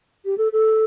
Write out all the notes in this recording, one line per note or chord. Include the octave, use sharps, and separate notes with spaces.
G4
A4
A4